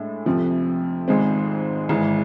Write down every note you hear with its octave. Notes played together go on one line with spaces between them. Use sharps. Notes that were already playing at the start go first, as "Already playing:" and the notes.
Already playing: A2 G#3 D4
F2 C3 F3
G#1 G#2 G#3 C4
G#1 G#2 E3